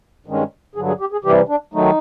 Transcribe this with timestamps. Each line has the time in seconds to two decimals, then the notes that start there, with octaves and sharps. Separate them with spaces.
0.26 G2 D#3 G#3 C#4
0.75 G2 D3 F#3 G#4
0.88 G#4
1.00 G4
1.12 G#4
1.24 C3 E3 G3 G4
1.48 D4
1.74 D#3 F#3 A3 D#4